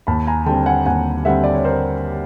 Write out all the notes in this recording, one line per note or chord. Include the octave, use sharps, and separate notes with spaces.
D#2 A5 B5
G#5 A#5
D3 G3 C4 G5 A5
F#5 G#5
D#2 F#5 G#5
D3 G3 C4 E5 F#5
D5
C#5
A#4 C5